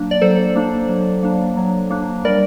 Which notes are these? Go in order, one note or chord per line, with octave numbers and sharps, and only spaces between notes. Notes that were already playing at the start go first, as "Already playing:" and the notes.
Already playing: F#3 A#3 D4
D5
F#3 A4 C5
A#3 D4
F#3
A#3 D4
F#3
A#3 D4
G3 A#4 D5